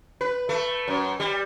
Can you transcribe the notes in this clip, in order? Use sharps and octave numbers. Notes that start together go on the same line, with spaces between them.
B4
A3
F#2
G3